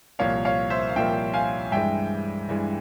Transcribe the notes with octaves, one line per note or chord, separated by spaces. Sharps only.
C2 A#2 F3 A#3 C#5 F5
C#5 F5
C5 E5
F5
C2 A#2 F3 A#3 E5 G5
F5 G#5
G2 E3 G#3 E5 G5
G2 E3 G#3